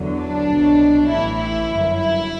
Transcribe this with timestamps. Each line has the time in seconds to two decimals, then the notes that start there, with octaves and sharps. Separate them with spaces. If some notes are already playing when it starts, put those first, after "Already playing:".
Already playing: E2 D3 F#3
0.20 D4
0.49 C2 B2 F#3
1.09 A1 A2 E3 E4
1.38 E4
1.69 G1 F#2 F#3
1.98 E4